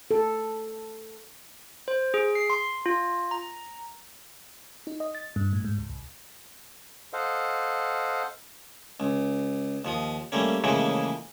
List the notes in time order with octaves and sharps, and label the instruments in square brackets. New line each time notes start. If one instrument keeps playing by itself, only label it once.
[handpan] A4
[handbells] C5
G#4
C7
C6
F4
A#5
[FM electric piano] D#4
D#5
A6
G2
A2
G#2
C#2
C2
[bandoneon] A4 C5 D#5 F5 F#5
[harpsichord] C#2
D#2 F3 D#6
G3 A3 A#3 C#4
A2 C#3 E3 F3 G#3 A#3